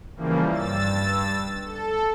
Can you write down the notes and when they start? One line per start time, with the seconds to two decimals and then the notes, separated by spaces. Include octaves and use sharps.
0.16 C#3 E3 F3 G3 A#3
0.51 G2 E6 A6
1.64 A4